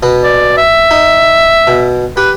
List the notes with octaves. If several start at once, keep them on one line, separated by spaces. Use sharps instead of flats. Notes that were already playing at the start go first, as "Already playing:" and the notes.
B2 B3
D5
E5
D#4
B2
G4 B4